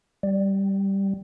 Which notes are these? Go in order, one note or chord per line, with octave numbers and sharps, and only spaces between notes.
G3